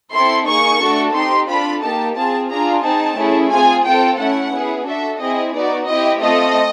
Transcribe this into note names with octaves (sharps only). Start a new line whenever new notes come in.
C4 E4 A4 C6
A#3 D#4 G#4 C#6
A3 D4 F#4 A4
C4 D#4 G4 C6
D4 F4 A4 B5
A#3 D#4 G4 A5
C4 F4 G#4 A5
D4 F4 G#4 A#5
C4 D#4 G#4 A5
A3 C#4 E4 G#4
C4 F4 G#4 G#5
C4 F4 A4 G5
A3 C#4 E4 F#5
B3 E4 G#4
D4 F#4 A4 E5
C4 E4 G#4 D#5
B3 D#4 F#4 D5
C4 E4 G4 D#5
A3 C4 F4 A4 D#5